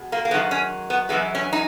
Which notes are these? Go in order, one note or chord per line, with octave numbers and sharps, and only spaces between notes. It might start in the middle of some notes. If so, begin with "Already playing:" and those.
Already playing: B2 G#3
A#3
A#3
F#2 D#3 G#3 B3
C#4
B3
F#2 E3 G#3 B3
C#4
D#4